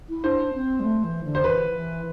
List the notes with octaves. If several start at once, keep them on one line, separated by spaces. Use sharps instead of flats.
E4
D4 C5
C4
G3
A3
E3
D3
C5
E3 B4
E3